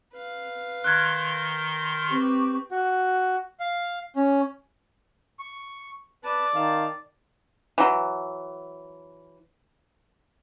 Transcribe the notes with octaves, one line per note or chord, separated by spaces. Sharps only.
B4 F5
D#3 A#4 C6 F#6 G#6
C4 G4 B4 C#6
F#4
F5
C#4
C#6
B4 D5 A5
D#3 F5 A5
E3 F#3